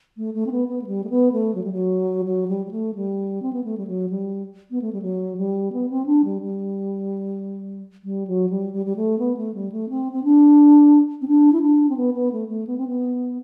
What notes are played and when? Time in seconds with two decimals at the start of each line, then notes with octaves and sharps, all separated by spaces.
0.17 A3
0.34 A3
0.46 C4
0.51 B3
0.68 B3
0.81 A3
0.86 G3
1.04 A3
1.09 B3
1.32 A3
1.55 F#3
1.64 G3
1.72 F#3
2.25 F#3
2.48 G3
2.66 G3
2.71 A3
2.95 G3
3.42 C4
3.53 B3
3.64 A3
3.77 G3
3.87 F#3
4.09 G3
4.71 B3
4.81 A3
4.92 G3
5.02 F#3
5.37 G3
5.72 B3
5.90 C4
6.06 D4
6.24 G3
6.42 G3
8.04 G3
8.27 F#3
8.49 G3
8.73 G3
8.86 G3
8.96 A3
9.18 B3
9.37 A3
9.54 G3
9.72 A3
9.89 C4
10.12 C4
10.24 D4
11.21 C4
11.28 D4
11.52 E4
11.62 D4
11.89 C4
11.96 B3
12.14 B3
12.32 A3
12.48 A3
12.67 B3
12.77 C4
12.87 B3